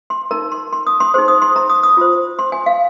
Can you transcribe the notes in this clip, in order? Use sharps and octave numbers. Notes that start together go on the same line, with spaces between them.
C6
D#4 A#4 A#5
C6
C6
D#6
C6
D#4 G#4 C5 C6
D#6
C6
A#5
D#6
D#6
F4 C5
C6
G#5
F5